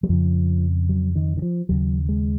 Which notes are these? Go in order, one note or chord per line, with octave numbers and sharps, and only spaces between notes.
F#3
F2 C#3 F3
F#3
D#3
D#3
F3
D#2 C#3 F#3
G#3